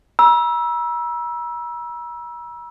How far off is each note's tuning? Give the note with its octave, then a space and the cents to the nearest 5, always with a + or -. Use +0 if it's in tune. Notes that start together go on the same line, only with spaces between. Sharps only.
A#5 +45 E6 +0